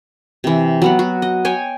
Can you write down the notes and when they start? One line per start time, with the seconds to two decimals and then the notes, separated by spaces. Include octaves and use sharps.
0.44 C3 E3
0.82 F#3 B3 F#5
0.99 F#4
1.22 D#5
1.45 C#5 G5 G#5